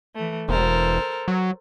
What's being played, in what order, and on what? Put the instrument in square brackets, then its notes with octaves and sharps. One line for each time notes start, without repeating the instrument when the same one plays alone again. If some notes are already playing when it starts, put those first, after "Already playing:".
[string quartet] E3 A3
[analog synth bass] E1 [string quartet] A4 A#4 C5
[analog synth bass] F#3